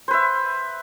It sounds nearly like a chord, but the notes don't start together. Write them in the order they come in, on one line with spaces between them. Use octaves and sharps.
C5 B4 E5